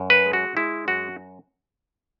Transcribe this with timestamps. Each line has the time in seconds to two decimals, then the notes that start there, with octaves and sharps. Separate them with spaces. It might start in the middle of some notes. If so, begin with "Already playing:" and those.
Already playing: F#2
0.10 B4
0.26 G#3
0.33 F#4
0.57 G#3 E4
0.88 F#2 F#4